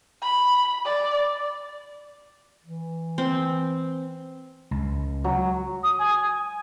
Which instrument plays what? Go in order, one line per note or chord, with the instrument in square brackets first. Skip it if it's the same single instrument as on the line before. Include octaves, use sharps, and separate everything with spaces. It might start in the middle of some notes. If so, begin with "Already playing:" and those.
[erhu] B5
D5
[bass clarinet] E3
[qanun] C4
[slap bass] C#2
[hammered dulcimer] F#3
[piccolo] D#6
G#5